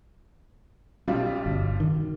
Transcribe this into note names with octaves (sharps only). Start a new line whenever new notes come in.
B1 G3 C#4 F4
G1
D#3